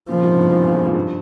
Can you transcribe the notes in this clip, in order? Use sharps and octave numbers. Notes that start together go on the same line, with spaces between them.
A#2 C#3 F3
G#2 C3
G2 A#2
G#2
E2 G2
E2
F2
G#2
G2